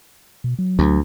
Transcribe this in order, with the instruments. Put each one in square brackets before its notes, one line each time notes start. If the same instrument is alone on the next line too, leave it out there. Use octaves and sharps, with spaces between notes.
[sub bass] B2
F#3
[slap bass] D2